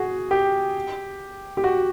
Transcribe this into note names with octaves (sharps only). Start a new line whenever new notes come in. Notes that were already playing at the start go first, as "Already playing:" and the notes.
Already playing: F#4 G#4
G4
G4
F#4